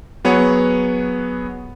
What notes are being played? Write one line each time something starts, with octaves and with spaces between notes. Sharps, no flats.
F#3 B3 G#4 C#5 F#5